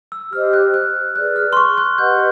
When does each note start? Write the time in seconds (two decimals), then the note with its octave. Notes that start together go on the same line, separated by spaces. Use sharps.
0.12 E6
0.32 G4 C5 D#5 F6
0.53 F#6
0.74 F#6
1.16 G#4 B4 D5 F#6
1.36 F6
1.53 C6
1.57 C#6
1.77 F#6
1.98 G4 B4 D#5 F#5 G6